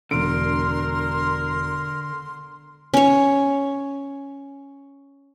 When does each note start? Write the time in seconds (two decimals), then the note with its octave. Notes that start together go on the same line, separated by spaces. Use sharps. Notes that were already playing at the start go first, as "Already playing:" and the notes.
0.11 E1 D3 A#4 C6 D7
2.94 C#4 C#5